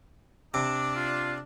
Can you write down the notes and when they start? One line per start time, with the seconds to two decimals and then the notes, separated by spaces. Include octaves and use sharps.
0.54 C3 D4 D6
0.96 F4